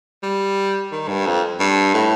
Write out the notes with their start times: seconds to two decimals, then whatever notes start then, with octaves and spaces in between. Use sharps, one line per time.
0.23 G3
0.92 D#3
1.08 G2
1.26 F2
1.60 G2
1.94 A2